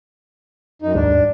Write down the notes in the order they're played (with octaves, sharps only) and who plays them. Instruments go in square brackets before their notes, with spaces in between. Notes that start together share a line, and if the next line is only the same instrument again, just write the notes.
[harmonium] F#2 D#4
[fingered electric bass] D#2 G#2 G3 [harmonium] D4